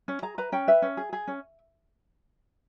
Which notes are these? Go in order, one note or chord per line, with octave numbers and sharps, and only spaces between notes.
C#4
G#4 A#5
B4 A#5
C#4 G5
B4 E5
C#4
G#4
G#4
C#4